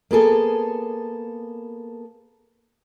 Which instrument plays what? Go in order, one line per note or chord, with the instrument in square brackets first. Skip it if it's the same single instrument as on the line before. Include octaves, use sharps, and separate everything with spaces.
[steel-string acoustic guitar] A#3 B3 G#4 A4